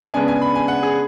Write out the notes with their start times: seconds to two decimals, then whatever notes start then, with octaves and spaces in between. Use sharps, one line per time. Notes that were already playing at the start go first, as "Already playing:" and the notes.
0.14 C#3 G#3 B3 D4 G#5
0.28 G#5
0.41 B5
0.55 G#5
0.68 F#5
0.83 G#4